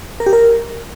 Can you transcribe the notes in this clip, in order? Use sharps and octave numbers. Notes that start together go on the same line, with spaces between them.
A#4
G4
A#4